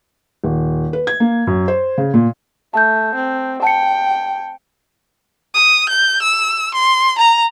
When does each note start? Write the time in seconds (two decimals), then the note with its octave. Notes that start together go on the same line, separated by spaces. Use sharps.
0.44 D#1
0.93 B4
1.07 G#6
1.20 A#3
1.47 F#2
1.68 C5
1.98 C#3
2.14 A#2
2.74 A3 A5 G6
3.15 C4
3.62 G5 A5 C#7
5.54 D#6
5.89 G6
6.22 E6
6.74 C6
7.19 A#5